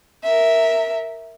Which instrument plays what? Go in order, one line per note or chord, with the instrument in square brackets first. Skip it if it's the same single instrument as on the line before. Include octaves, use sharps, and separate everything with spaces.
[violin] A#4 E5